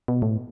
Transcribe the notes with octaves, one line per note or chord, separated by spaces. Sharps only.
B2
A2